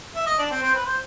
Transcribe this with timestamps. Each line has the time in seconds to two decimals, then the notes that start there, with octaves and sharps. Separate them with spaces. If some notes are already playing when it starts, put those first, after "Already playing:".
0.15 E5
0.27 D#5
0.39 D4 D5
0.51 C4 C5
0.63 C4 C5
0.75 B4
0.86 C5